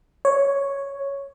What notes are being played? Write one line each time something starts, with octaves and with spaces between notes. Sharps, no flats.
C#5